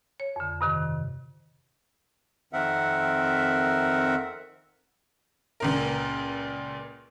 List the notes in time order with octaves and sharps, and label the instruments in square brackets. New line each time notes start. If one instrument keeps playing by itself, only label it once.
[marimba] C#5
F2 D3
G2 C3 D#3
[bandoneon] F2 D#3 C4 A#4 E5 F#5
[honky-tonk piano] C#2 A#2 A#4